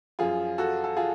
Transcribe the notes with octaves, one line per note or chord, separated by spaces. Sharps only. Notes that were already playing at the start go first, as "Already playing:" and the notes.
F#2 F3 F4 G#4
F#4 A4
A4
F4 G#4